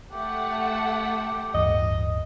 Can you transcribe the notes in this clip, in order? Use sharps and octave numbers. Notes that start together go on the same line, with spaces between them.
A3 G4 F#5
D1 G2 E3 D#5